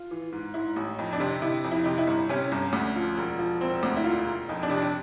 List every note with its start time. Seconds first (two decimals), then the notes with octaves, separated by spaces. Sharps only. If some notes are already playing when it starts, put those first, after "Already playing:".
Already playing: F4
0.11 E3
0.32 G#2
0.54 G#2 E4
0.76 A1
0.99 F2 D#4
1.13 D4
1.20 C3
1.28 D#4
1.42 C3 E4
1.64 F2
1.72 E4
1.84 C3 D#4
1.98 E4
2.07 G1
2.29 C3 C#4
2.52 G1
2.73 D2
2.95 F3
3.17 E1
3.38 F3
3.61 E1 C4
3.83 D2
3.97 E4
4.04 E1 F4
4.26 E1
4.48 F2 D#4
4.63 D4
4.70 C3
4.77 D4